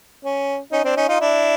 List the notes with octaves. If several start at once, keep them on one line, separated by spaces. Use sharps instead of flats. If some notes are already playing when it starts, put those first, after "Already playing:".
C#4
C#4 D#4
C4 D4
C#4 D#4
D#4 F4
D4 E4